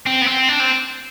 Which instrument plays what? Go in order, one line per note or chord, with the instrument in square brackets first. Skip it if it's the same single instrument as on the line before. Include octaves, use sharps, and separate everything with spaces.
[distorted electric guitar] C4
B3
C4
D4
C4